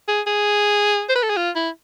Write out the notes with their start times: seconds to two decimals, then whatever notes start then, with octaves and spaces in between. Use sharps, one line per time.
0.08 G#4
0.27 G#4
1.09 C5
1.15 B4
1.23 A4
1.30 G#4
1.37 F4
1.56 E4